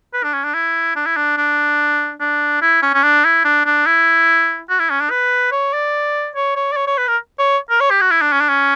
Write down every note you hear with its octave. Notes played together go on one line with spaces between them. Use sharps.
B4
D4
C#4
D4
E4
D4
E4
D4
D4
D4
E4
C#4
C#4
D4
E4
D4
D4
E4
F#4
E4
C#4
D4
B4
C#5
D5
C#5
C#5
D5
C#5
C#5
B4
A#4
C#5
A#4
C#5
G4
F#4
E4
D4
C#4
D4
C#4